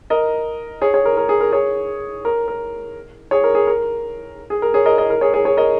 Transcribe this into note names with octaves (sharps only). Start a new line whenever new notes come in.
A#4 D#5
G#4 C#5
G#4 C#5
A#4
A#4
G#4
A#4
G#4 C#5
A#4
A#4
G#4 C#5
A#4
G#4
A#4
G#4
A#4
G#4 C#5
A#4 D#5
A#4 D#5
A#4
G#4 C#5
G#4 C#5
G#4 C#5
A#4 D#5